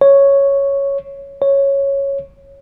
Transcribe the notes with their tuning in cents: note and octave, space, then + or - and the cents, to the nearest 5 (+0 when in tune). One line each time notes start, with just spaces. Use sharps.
C#5 +0
C#5 -5